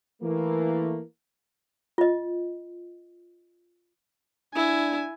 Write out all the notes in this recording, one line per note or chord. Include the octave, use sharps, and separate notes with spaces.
E3 A3 A#3
F4 D#5
D4 E4 G#5